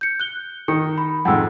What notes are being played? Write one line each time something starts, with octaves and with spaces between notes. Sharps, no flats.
G6 C#7
F#6 G7
D#3 C#7
B5
F2 G#2 F#5 G5 E6